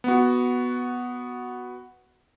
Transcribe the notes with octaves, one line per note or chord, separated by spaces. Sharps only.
B3 F#4